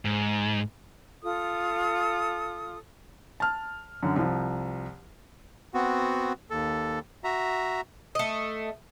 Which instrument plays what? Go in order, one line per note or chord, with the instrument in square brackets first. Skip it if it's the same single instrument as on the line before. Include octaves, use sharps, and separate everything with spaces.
[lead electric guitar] G#2
[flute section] F4 A4 D#6
[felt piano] A5 F6
F#2 D3
C2 F3
[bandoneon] B3 C4 F#4
D#2 A4
F#4 E5 A#5
[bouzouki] A3 D#5